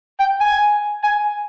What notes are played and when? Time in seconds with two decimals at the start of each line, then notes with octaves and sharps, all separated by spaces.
0.19 G5
0.40 G#5
1.03 G#5